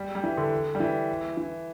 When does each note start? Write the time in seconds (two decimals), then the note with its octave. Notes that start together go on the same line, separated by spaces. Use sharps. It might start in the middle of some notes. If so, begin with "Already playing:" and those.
Already playing: G3
0.15 G3
0.24 E3
0.38 D3
0.75 G3
0.80 E3
1.37 E3